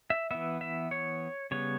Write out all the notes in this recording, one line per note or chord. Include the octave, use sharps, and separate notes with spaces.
E5
E3 B3 E5
E5
C#5
C#3 G3 B3 C#5